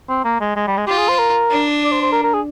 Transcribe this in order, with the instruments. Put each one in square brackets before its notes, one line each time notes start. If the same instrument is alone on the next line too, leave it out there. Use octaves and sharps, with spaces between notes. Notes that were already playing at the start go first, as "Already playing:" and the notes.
[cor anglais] C4
A#3
G#3
G#3
G3
G#3
[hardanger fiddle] F4 [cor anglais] G4
[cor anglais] G#4
C5
A#4
[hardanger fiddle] D4
[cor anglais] D5
C5
C5
A#4
A#4
G#4